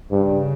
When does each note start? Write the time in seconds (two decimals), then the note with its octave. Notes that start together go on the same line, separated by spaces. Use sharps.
0.11 G2 C#3